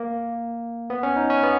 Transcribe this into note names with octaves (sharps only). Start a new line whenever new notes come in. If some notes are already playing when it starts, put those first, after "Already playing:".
Already playing: A#3
B3
C#4
D#4
C#4
B3